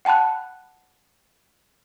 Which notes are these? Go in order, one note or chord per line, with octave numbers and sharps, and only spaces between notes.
F#5 G5 A5 B5 F#6